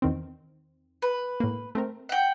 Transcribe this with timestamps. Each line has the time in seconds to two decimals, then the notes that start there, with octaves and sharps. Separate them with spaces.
0.02 E2 D#3 C4
1.02 B4
1.40 A2 A#3
1.75 A3 C4 A#4
2.09 F#5 G5